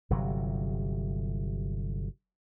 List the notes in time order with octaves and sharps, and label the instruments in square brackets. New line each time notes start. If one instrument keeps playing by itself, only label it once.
[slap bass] G1 C3 F#3